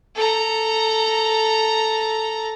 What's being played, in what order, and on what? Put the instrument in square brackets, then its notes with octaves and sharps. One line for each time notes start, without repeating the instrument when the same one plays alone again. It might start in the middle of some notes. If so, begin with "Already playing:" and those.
[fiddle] A4 A#5